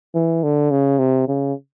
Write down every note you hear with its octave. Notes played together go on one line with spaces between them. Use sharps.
E3
D3
C#3
C3
C#3